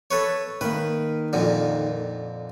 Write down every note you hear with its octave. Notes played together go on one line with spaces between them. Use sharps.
A4 B4 C#5
D#3 A#3 B4
F2 A#2 D3